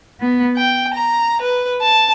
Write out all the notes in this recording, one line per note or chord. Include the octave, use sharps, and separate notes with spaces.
B3
G5
A#5
B4
A5